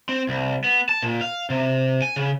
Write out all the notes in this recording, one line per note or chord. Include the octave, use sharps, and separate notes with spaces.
C4
C2
B3
A5
A#2
F5
C3
G#5
C#3